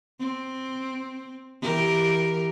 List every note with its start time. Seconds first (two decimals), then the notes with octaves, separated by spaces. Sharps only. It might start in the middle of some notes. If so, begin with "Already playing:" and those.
0.20 C4
1.62 E3 G4 A#4